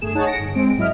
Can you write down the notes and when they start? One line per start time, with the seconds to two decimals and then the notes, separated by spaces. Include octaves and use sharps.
0.01 G1 A3 G#4 E7
0.15 D#4 G#4 C#5 F#5 A5
0.27 A#6 C#7 D7
0.39 G1
0.55 G#3 C4 D7
0.78 G#2 F#3 E4 D#5 E5 F6